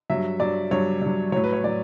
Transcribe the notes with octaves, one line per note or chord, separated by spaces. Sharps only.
G2 F#3 E5
G2 F#3 D5
G2 F#3 C#5
G2 F#3
A2 F#3 C#5
B4
C#5
A2 F#3 D5